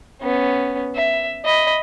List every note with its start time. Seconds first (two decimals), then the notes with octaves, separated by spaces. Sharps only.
0.22 B3 C#4
0.95 E5
1.45 D#5 B5